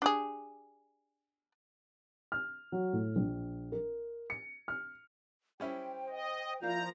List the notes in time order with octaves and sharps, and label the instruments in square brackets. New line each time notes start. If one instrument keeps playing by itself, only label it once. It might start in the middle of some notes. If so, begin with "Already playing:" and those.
[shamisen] D4 G4 G#4
[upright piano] F6
F#3
A2
A#1
A#4
C#7
F6
[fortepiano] G3 C#4 E4 [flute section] C5 G5
[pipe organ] D#5
[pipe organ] F3 A#5 [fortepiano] A#3 F5 [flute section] E4 D5 G6 [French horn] F4